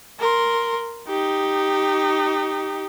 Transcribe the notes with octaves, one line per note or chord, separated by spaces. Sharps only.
A#4 C6
D#4 G4